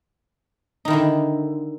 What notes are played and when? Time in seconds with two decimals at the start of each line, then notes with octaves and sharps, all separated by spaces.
0.85 D#4
0.88 D#3
0.90 E4
0.93 D3